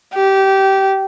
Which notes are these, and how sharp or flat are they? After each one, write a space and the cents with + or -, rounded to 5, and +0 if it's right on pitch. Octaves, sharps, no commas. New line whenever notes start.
G4 -20